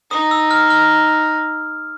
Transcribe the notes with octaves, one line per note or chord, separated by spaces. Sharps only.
D#4 D#6
E6
F6
F6